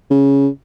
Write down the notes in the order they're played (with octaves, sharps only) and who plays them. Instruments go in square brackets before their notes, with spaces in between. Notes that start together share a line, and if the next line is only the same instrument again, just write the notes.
[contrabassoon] C#3